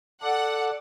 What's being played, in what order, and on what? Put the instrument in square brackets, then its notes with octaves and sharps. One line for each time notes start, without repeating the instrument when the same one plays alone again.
[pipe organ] A4 D5 [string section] F#5